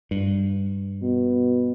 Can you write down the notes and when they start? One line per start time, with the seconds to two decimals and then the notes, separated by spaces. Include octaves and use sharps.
0.11 G2
1.02 B2